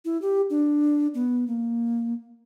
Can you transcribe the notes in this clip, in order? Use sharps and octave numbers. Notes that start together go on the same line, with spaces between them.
E4
G4
D4
B3
A#3